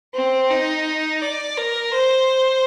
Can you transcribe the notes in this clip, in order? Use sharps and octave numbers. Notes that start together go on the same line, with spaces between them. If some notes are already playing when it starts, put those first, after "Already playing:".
C4
D#4
D5
A#4
C5